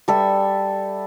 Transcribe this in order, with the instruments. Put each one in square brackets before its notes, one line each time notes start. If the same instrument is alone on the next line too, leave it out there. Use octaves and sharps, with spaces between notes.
[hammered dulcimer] G3 A4 E5